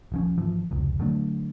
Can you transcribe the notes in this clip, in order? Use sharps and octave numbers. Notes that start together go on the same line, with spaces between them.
D#1 F3 C#4
G#1 E3 F3
F1 C#2
D3 F#3 A3 D4